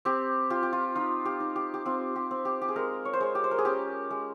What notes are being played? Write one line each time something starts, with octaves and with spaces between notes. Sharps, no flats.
C4 G4
F4 G4
G4
F4
D#4 F4
G4
D#4
G4
G4
C4 F4
G4
C4
G4
G4
G#4
G#3 A#4
C#5
C5
G#3 C#5
G4
C5
A#4
G#4
C#4 G4
G#3